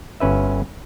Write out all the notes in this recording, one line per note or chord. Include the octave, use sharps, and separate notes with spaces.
G1 C#4 B4 E5